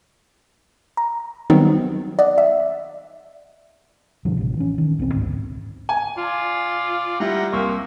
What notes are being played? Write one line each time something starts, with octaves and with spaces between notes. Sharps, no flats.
A#5
D#3 F#3 G3 B3 C4 D#4
D5 D#5 F#5
E5
G2 B2 D3 F3
A1 C3
E3 C#4
D#3
E1 B1 A#3 C4
A1 D2 G#2
G#5
F4 D5 C6
G3 E4 F#5 G5 A#5
C2 A#3 E5 C6 C#6